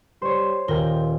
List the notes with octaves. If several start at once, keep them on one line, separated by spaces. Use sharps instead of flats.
G3 C5 C#5
D#1 F4 A4 A#4 G5 A#6